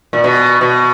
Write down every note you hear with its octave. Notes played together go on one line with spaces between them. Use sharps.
A#2
B2
B2